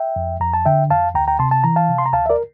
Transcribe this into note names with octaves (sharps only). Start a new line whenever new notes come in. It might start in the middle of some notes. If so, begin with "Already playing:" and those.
Already playing: E5 G5
F2
F2 A#5
A5
D3 E5 G5
F2 F5 A5
D2 G5 A#5
G5 A#5
C3 A5 C6
A5
E3 A#5
F5 A5
C3
C6
A#5
D2 F5 A5
E5
A#4 D5